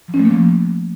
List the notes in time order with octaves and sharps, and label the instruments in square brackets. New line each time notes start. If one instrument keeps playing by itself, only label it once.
[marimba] F3
C#4
A3
A#3
F3